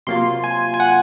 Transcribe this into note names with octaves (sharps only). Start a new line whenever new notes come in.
C3 F#3 A#3 F4 C6
G#5
G#5
F#5